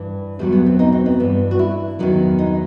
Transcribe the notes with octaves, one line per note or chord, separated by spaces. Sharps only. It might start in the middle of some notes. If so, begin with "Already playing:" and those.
Already playing: G2 E3
E2 B2 F#3 G3
B3
C4
D#4
C4
B3
G2 E3
F#4
E4
E2 C3 D#3 F#3
D#4